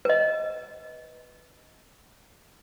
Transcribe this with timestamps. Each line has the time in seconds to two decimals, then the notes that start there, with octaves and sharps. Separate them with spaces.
0.05 B4 D#5